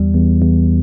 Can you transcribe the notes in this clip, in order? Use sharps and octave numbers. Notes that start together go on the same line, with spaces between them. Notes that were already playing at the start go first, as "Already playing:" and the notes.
Already playing: E2 G3
E2
E2